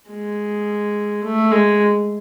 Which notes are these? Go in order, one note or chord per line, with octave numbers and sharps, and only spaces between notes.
G#3
A3
G#3